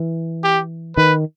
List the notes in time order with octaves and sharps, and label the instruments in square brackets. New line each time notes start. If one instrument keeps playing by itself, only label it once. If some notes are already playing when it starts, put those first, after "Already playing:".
Already playing: [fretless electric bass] E3
[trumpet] G4
[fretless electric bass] D#3 [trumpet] B4